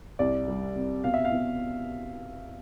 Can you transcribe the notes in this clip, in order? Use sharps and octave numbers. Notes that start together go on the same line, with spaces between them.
C2 D5
G3
C3
B2 F5
E5
F5
B2